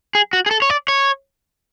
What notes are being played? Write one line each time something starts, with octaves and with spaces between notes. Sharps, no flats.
G#4
F#4
G#4
A4
C#5
D5
C#5